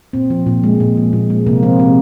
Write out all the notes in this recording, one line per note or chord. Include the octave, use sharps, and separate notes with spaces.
A#2 C4
F3
A#2
G#3
A#2
F3
A#2
G#3
C3 A#3
F3 C4
C3 C4